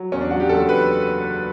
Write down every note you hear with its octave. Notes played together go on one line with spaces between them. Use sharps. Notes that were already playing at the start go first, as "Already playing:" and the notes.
Already playing: F#3
E2 C#4
D4
F#3 F#4
G4
F#1 A4
E2 B4